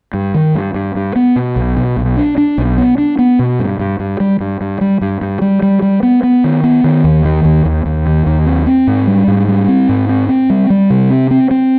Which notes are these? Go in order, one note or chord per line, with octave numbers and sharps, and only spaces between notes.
G2
D#3
G2
G2
G2
B3
B2
B1
B2
B1
D4
D4
B1
B3
D4
B3
B2
G2
G2
G2
G3
G2
G2
G3
G2
G2
G3
G3
G3
B3
B3
D#3
B3
D#3
D#2
D#3
D#2
D#2
D#2
D#3
D#2
C4
C4
G#2
G3
G#2
G3
C4
G#2
C4
C4
G3
G3
C3
C4
C4
C4